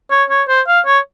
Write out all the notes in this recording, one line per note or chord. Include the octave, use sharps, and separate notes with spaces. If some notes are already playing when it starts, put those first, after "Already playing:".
C#5
C#5
C5
F5
C#5